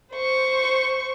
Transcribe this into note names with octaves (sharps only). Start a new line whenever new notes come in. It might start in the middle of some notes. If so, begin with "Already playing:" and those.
C5 C#6